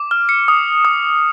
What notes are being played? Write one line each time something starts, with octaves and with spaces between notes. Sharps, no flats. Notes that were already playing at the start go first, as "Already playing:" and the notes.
Already playing: D6
F6
C#7
D#6
D#6